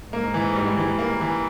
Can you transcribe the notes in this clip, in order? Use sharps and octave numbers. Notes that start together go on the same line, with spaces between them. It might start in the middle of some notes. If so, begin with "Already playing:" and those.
G#2 A#3
E3
G3
E3
A#3
E3